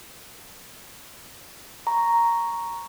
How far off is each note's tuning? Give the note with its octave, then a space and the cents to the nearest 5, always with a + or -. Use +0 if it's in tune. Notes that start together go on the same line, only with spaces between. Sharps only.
A#5 +0 C#6 +0